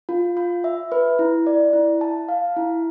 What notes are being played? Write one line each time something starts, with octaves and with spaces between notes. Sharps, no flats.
F4
F4
E5
B4
E4
D5
E4
A5
F5
E4